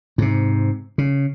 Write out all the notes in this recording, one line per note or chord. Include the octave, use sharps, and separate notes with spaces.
G#2 C3
C#3